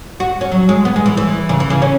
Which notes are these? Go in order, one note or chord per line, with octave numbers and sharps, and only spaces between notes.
F#4
C#4
F#3
G#3
B3
G#3
E3
E3
C#3
E3
C#3
C#4